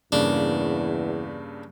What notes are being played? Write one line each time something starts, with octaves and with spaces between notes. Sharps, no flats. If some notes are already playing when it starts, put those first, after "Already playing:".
E2 G2 C#3 A#3 D4